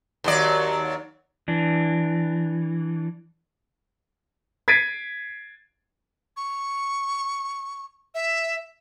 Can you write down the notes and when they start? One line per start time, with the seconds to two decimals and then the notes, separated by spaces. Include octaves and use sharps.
0.24 D#2 F#3 D5
1.48 E3 D4
4.68 G#6 A6 B6 C7 D7 D#7
6.37 C#6
8.15 E5